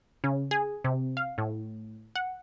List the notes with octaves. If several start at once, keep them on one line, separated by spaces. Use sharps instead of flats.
C#3
G#4
C3
F5
A2
F#5